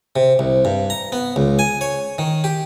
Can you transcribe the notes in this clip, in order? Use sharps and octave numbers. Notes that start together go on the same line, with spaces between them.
C3
C2
G2
A#5
B3
C#2
G#5
C#5
D#3
G4